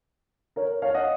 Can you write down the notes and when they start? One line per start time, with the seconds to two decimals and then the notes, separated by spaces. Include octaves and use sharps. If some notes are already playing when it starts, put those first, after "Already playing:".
0.56 A#4 C#5
0.82 C#5 F5
0.94 D#5 F#5